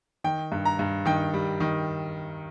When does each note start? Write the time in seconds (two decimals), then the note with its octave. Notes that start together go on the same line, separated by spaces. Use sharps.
0.24 D#3 G5
0.52 G2
0.65 A#5
0.79 G2
1.05 D#3 G5
1.34 G3
1.60 D#3